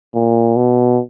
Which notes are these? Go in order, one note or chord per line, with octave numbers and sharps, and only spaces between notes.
A#2
B2